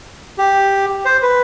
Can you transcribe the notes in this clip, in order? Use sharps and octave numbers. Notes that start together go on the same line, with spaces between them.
G4
C5
B4